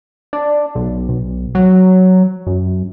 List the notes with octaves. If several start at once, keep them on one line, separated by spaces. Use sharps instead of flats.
D4
B1
B1
F#3
F#2